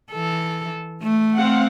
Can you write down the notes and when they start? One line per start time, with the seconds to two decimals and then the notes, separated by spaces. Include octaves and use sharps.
0.12 E3 A4
1.02 A3
1.36 C4 F5 F#5